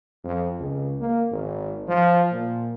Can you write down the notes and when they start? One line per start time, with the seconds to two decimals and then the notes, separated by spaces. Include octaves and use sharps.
0.24 F2
0.59 C#2
1.00 A#3
1.31 G#1
1.87 F3
2.32 A#2